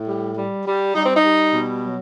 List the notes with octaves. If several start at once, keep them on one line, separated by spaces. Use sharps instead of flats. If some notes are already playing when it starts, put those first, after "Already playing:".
Already playing: A2
G3
G3
G3
G3 D#4
C4
D#4
G3
B2
F#3